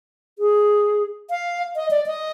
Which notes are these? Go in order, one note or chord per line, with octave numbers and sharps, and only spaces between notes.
G#4
F5
D#5
D5
D#5